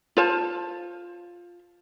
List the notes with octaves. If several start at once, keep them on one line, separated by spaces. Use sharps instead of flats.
F4 C5 A5